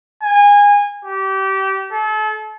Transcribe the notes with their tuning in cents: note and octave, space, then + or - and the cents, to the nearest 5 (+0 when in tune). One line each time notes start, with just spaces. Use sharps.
G#5 -25
G4 -25
A4 -35